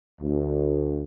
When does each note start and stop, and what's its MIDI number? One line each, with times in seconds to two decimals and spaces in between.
0.21 1.03 38